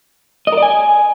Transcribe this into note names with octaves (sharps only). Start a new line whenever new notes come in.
D#5
A#4
D5
G#5